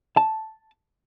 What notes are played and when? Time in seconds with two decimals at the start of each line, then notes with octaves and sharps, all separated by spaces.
0.17 A5